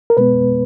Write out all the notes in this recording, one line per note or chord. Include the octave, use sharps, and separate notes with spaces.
A#4
B2 G#3 B3 B4